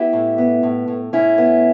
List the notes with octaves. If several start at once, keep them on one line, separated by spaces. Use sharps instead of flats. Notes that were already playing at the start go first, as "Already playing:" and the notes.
Already playing: B3 E4 G4
A2
B3
A2
A2
A2 C#4 E4
B3